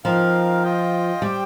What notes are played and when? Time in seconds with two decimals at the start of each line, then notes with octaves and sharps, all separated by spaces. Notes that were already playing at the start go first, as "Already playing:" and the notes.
0.04 F3 C4 D#4 A#4 F5
0.63 F4 D#5 G5
1.22 G3 G4 C5 G5